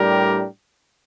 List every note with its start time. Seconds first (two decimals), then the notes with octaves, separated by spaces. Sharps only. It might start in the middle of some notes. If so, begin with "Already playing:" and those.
Already playing: A2 G3 D4 G4 A#4